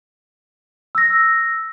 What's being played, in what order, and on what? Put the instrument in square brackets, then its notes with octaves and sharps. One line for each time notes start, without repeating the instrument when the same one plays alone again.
[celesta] E6 A#6